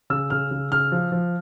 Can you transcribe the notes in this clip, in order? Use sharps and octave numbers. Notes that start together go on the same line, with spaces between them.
C#3 E6
C#3 F6
C#3
C#3 F6
F3
F3